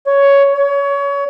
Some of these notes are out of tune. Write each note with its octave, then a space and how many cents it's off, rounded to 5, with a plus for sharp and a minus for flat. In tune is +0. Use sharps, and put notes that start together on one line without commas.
C#5 +10
C#5 +25